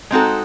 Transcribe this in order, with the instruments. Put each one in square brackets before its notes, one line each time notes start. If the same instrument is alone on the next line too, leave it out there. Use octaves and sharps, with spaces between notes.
[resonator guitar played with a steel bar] G#3 C4 D#4 F#4 A4